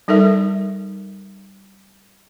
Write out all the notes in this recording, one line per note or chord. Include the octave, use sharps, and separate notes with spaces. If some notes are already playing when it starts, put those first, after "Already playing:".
G3 D#4 A4 A#4 E5